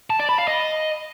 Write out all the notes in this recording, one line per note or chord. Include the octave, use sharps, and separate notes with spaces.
A5
D5
B5
F5
D#5